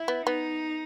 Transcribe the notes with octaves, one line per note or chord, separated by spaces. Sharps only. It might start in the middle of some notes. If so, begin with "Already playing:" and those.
Already playing: E4
B3
B3 D#4